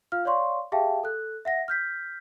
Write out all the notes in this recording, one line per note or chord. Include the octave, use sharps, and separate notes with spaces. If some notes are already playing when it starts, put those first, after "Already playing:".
F4 F5 F6
C#5 D5 F5 C6 C#6
G4 G#4 E5 F5 G5 A5
A4 F#6
E5 F#5 A#6
F6 G6 B6